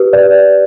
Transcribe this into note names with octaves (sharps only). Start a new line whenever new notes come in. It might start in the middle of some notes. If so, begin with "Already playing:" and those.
Already playing: G4 B4
D5